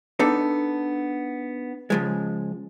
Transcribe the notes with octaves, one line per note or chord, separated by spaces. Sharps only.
B3 D4 D#4 A4
C#3 F3 G#3